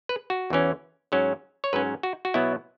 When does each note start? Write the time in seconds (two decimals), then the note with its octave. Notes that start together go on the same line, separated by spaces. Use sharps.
0.09 B4
0.30 F#4
0.50 E2 E3 C#4
1.12 G#2 F#3 C#4
1.64 C#5
1.73 G#2 F#3 C#4 B4
2.03 F#4
2.25 F#4
2.34 B2 F#3 B3 E4